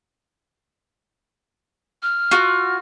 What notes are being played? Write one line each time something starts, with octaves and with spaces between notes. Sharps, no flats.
F6
F4 F#4